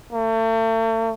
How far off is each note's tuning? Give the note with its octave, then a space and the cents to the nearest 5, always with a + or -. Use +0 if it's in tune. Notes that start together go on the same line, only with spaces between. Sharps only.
A3 +40